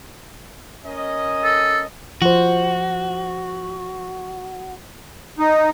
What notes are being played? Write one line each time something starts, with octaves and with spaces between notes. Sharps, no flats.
C#4 A#4 D#5
A4
F3 F#4 C5
D#4